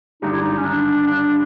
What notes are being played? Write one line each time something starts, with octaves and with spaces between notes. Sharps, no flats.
G#1 G2 D3 G3 D#4
E4
D#4
C#4
D4
D4